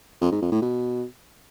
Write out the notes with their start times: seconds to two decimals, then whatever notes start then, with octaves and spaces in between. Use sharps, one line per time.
0.21 F2
0.31 G#2
0.42 F2
0.52 A2
0.62 B2